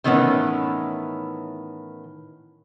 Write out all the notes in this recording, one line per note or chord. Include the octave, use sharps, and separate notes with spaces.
A2 D#3 E3 B3 C#4